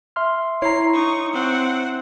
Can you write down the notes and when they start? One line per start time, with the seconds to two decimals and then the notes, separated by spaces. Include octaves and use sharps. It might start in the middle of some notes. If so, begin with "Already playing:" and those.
0.16 E5 C6 F6
0.62 E4 C#5 A#5 C7
0.93 D#4 C#6
1.33 C4 F#5